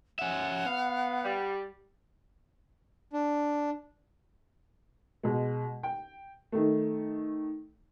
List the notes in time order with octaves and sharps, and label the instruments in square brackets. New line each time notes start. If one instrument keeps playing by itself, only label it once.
[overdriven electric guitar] C#4 E5 [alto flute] F#5
[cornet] B3 [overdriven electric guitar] F5
[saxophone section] G3
[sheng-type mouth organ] D4
[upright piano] B2 G#3
G5
D#3 A3